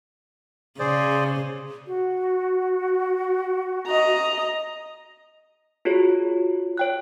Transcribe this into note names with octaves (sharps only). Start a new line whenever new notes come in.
C#3 G#4 C5 D5
F#4
D#5 A#5
F4 F#4 G#4 C#5
C#5 G5 F#6